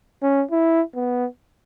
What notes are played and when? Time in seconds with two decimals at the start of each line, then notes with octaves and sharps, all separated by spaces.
0.23 C#4
0.51 E4
0.95 B3